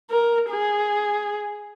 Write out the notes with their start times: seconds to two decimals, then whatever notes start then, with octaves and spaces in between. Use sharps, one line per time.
0.11 A#4
0.50 G#4